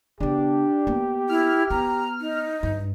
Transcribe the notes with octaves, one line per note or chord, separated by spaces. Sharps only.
C#3 B3 D4 G4
A#3 B3
E4 F6
B3 A#5
D#4
G2